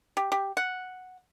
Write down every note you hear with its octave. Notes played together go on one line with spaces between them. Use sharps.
G4
G4
F#5